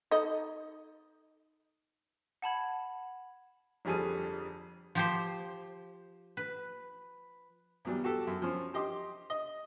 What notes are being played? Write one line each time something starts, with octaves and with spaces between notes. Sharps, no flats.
D#4 A4 D#5
F#5 A5 B5 G#6
G1 F2 G3 G#4 A4 D#7
F3 G4 C5
B4
E2 F#3 G3
F#4 G4 A4
F#2
F3 C#4
G4 D#5 C6 D6
D#5